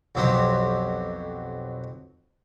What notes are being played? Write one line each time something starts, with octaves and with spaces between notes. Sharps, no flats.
B1 F2 F#3 C4 G4 C5